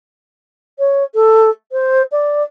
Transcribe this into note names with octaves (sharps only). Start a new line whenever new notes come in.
C#5
A4
C5
D5